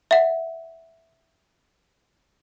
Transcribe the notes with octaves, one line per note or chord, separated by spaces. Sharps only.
E5 F#5